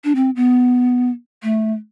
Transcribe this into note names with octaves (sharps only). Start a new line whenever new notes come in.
D4
C4
B3
A3